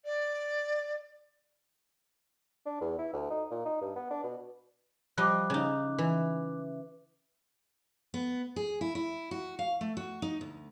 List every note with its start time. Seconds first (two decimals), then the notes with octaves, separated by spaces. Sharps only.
0.05 D5
2.66 D4
2.81 E2
2.98 E4
3.13 D2
3.30 D#4
3.51 A#2
3.65 D#4
3.81 G2
3.96 B3
4.11 D4
4.24 B2
5.17 F3 G3 D#5 D6 F#6
5.50 C#3 D#4
5.98 E3
8.14 B3
8.56 G#4
8.81 E4
8.95 E4
9.31 F#4
9.59 F5
9.81 A3
9.97 F#4
10.22 D#4
10.41 D2